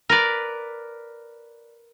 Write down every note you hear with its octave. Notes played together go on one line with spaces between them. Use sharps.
A#4 B4 D5